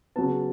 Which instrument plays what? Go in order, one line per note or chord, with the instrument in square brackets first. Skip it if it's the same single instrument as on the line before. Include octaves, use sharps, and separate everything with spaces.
[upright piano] C#3 F#3 B3 A5